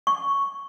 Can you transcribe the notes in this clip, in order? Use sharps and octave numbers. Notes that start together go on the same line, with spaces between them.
C#6